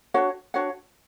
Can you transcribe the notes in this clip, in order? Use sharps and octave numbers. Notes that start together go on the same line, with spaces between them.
D4 F#4 C#5 F#5
D4 F#4 C#5 F#5